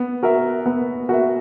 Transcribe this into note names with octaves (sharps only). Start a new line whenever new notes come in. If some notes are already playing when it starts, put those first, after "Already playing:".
Already playing: B3
F#4 A#4 E5
B3
F#4 A#4 E5